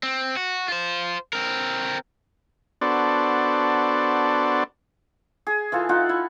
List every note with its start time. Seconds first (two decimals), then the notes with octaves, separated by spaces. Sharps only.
0.03 C4
0.37 F#4
0.68 F4 C5
1.33 C4 A#4
2.81 B3 D4 F#4 A4 C5 D5
5.47 G#4
5.72 E3 F4 A4
5.89 D#4 F4 F#5
6.09 E4